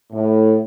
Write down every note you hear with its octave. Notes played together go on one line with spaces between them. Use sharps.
A2